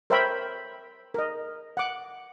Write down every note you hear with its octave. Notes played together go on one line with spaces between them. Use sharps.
A#4 C5 C#5 E5 G5 B5
A#4 D#5
F#5 D6